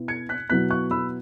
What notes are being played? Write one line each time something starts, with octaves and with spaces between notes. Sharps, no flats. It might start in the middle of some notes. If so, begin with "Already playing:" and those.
Already playing: B2 B3 E4
G#6 C#7
F#6 B6
B2 F#3 B3 E4 F#6 B6
C#6 F#6
B5 E6